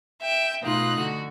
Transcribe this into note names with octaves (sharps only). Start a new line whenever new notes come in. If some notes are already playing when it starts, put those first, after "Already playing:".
E5 G5
B2 A3 D#4 F4 F#6
D3 F#4